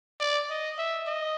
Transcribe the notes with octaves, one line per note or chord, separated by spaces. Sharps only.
D5
D#5
E5
D#5